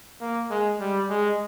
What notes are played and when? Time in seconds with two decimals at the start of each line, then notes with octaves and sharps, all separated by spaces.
0.21 A#3
0.51 G#3
0.80 G3
1.10 G#3